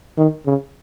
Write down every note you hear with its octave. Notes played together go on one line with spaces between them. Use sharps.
D#3
C#3